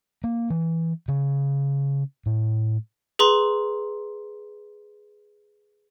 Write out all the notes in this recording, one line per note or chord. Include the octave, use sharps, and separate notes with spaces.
A#3
E3
C#3
A2
G#4 B4 A#5 C6